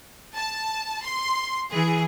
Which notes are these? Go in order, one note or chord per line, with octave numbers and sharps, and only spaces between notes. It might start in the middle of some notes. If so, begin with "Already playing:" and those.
A5
C6
E3 G#4